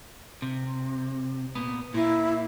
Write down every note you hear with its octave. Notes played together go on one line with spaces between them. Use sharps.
C3
A#2 B3
A#2 A#3 E4